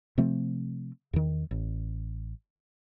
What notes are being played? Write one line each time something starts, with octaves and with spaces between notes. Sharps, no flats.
C3 F3 A3 C4
E2 D#3
A1